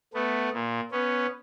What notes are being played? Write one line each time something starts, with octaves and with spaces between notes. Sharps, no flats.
A3 B3
A#2
B3 C#4